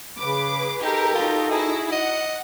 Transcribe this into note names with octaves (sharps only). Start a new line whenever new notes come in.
C#3 G#4 B4 D6
D#4 G4 A4 A#4
D#4 F4 F#4
E4 G#4
D#5 F#5